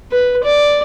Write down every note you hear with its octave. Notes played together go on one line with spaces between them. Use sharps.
B4
D5